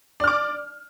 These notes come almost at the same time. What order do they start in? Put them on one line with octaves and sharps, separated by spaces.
D5 F6 D6